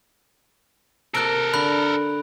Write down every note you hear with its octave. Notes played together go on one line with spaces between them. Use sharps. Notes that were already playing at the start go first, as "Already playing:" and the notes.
C3 A#3 A4 A#4 F#6 D7
D3 B5 F#6